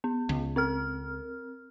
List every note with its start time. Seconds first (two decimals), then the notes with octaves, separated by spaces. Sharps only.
0.04 B3
0.29 C#2
0.56 C4 A#4 F6